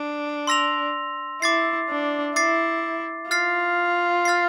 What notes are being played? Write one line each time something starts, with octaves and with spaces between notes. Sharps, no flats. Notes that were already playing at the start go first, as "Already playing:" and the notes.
Already playing: D4
C6 E6 A#6 F7
E4 D6 A6 C7
D4
E4 D6 A6 C7
F4 F6 A6 C7
F6 A6 C7